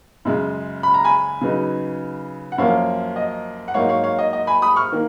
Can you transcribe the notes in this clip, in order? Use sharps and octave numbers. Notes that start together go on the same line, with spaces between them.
F#2 C#3 G#3
B5
A#5
G#5 B5
C#3 F#3 B3 D#4
F#5
F#2 F3 A#3 C#4 C#5 F5
D#5
F#5
G#2 F#3 A#3 D#4 C#5 F5
C#5 F5
C#5 F5
D#5
D#5
G#5 B5
B5 D#6
C#6 F6
D#3 A#3